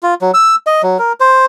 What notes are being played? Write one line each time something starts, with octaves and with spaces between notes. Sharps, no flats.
F4
F#3
E6
D#5
F#3
A#4
C5